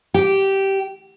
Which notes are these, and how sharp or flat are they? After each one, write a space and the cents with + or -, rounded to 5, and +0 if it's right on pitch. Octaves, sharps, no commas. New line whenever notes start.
G4 -10